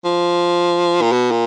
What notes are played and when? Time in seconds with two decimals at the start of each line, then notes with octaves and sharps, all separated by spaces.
0.05 F3
1.01 A#2
1.12 B2
1.31 A#2